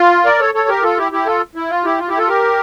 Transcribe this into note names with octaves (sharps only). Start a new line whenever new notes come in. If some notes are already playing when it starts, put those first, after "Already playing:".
Already playing: F4
A#4 D5
A4 C#5
A4 C#5
G4 A#4
F4 A4
E4 G4
E4 G4
F4 A4
E4
F4
E4 G4
F4
E4 G4
F4 A4
G4 A#4